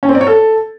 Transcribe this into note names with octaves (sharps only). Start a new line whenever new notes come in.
C#4
C4
D5
C#5
A4